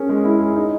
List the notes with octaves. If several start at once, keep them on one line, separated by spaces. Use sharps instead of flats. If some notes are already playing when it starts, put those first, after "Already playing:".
Already playing: C#4 G#4 A#4
G#3
E4
G#4
D#4